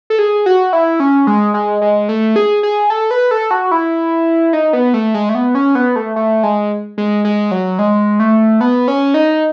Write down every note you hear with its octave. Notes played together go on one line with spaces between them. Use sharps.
A4
G#4
F#4
E4
C#4
G#3
G#3
G#3
A3
G#4
G#4
A4
B4
A4
F#4
E4
D#4
B3
A3
G#3
A3
B3
C#4
B3
A3
A3
G#3
G#3
G#3
F#3
G#3
A3
B3
C#4
D#4